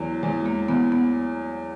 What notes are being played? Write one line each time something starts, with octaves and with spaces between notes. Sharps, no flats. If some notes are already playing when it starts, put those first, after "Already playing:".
Already playing: E2 F#3
E2 G#3
A#3
E2 B3
B3